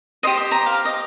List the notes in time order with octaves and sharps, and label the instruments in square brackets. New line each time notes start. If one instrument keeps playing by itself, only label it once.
[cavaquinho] G4 C5 D#5 D#6
C6
A#5
F5
D#5